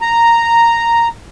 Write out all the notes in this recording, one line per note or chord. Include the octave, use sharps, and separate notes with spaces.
A#5